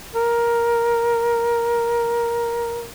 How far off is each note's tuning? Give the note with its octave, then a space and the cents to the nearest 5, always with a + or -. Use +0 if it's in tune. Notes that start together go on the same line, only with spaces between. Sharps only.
A#4 +10